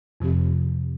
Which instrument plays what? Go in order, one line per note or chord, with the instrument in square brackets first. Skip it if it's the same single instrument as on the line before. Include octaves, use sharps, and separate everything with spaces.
[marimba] F2 C3 F3 C4 G4